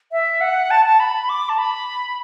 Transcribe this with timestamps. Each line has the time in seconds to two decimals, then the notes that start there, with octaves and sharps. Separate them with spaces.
0.12 E5
0.41 F#5
0.71 A5
0.85 A5
1.00 B5
1.29 D6
1.49 A5
1.58 B5